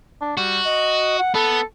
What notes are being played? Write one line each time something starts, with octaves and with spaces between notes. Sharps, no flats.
D4
G3 F#4
D#5
F#5
B3 A4